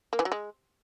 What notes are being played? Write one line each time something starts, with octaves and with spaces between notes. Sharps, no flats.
A#3
E3
F#3
G#3